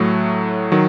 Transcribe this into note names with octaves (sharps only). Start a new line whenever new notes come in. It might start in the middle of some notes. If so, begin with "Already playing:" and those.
Already playing: A2 F#3 A3
D#3 F#3